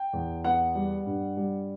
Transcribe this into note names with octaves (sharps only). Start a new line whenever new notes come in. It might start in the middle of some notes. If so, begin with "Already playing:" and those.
Already playing: G5
E2
B3 F#5
G3
G2
G3